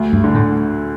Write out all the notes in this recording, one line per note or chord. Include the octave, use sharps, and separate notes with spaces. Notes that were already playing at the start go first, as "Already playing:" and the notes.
Already playing: D2
G2
D3
A2